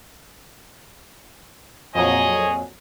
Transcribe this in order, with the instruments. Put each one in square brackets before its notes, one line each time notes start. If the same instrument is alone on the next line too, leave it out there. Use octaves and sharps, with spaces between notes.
[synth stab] F2 A#2 F#3 [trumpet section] G#4 C#5 D#5 [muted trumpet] G#5